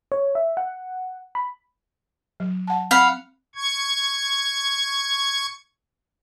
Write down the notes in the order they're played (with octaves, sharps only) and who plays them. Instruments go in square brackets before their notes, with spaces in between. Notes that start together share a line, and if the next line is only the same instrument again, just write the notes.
[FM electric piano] C#5
E5
F#5
B5
[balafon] F#3
F#5 A5
[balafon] C4 [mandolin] F5 F#5 B5
[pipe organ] C#6 G#6